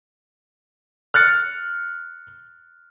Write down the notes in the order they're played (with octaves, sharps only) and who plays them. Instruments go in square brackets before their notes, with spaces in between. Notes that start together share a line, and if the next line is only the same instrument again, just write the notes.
[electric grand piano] F6 F#6 A6 C#7